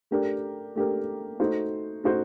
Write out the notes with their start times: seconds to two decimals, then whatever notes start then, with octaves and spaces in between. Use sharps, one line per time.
0.11 A3 D4 G4 A#4
0.75 A3 D4 G4 A#4
1.40 A3 D#4 F#4 C5
2.04 A3 D#4 F#4 C5